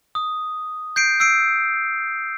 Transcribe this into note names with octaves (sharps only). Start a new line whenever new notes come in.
D#6
G6 C7 D7
E6 C7 D7